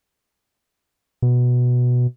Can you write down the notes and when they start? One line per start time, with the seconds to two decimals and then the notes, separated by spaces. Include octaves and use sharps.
1.22 B2